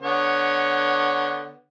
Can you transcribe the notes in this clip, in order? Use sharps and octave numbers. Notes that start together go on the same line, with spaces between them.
D3 B3 C#5